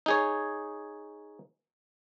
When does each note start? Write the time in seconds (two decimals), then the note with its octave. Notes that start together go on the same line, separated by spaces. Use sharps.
0.06 D#4 G#4 C#5